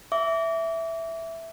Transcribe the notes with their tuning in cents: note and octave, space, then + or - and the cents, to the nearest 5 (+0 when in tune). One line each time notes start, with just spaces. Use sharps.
E5 +0 D6 -35